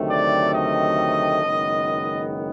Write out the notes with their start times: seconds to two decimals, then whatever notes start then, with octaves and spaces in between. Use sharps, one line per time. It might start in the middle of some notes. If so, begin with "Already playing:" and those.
Already playing: D2 C3 D#3 F#3 A3
0.10 D5
0.54 D#5
1.43 F#1 F#2 D#3 G#3 B3